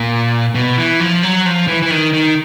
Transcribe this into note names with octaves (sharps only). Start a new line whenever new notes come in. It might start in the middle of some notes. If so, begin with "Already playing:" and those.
Already playing: A#2
B2
E3
F3
F#3
F3
E3
E3
D#3
D#3